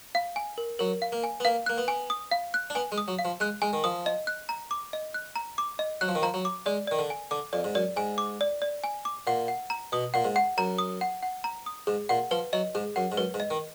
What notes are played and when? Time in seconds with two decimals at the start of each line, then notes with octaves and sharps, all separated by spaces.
0.15 F5
0.36 G#5
0.58 A#4
0.79 F#3 A#4
1.02 F5
1.12 A#3
1.24 G#5
1.40 B3
1.45 A#3 F5
1.66 A#3 F#6
1.78 B3
1.88 G#5
2.10 D#6
2.31 F5
2.54 F#6
2.70 D4
2.75 B3 G#5
2.92 G#3
2.98 D#6
3.08 F#3
3.19 F5
3.25 F3
3.40 G#3 F#6
3.62 G#3 G#5
3.73 D#3
3.84 F3 D#6
4.06 D#5
4.27 F#6
4.49 A#5
4.71 D6
4.93 D#5
5.14 F#6
5.36 A#5
5.58 D6
5.79 D#5
6.01 F#3 F#6
6.08 F3
6.15 D#3
6.22 F3 A#5
6.34 F#3
6.45 D6
6.66 G#3 D5
6.87 D#3 D5
6.99 D3
7.10 G#5
7.31 D3 D6
7.53 F2 D5
7.64 G#2
7.75 F#2 D5
7.97 G#2 G#5
8.18 D6
8.41 D5
8.62 D5
8.84 G#5
9.05 D6
9.27 A#2 F#5
9.48 F#5
9.70 A#5
9.92 B2 D#6
10.14 A#2 F#5
10.24 G#2
10.36 F#5
10.58 F#2 A#5
10.78 D#6
11.01 F#5
11.23 F#5
11.44 A#5
11.66 D#6
11.87 G#2 G#4
12.09 A#2 F#5
12.31 F3 B4
12.53 F#3 D#5
12.75 G#2 G#4
12.96 F#2 F#5
13.12 G#2
13.17 F#2 B4
13.34 G#2
13.40 D#5
13.50 D#3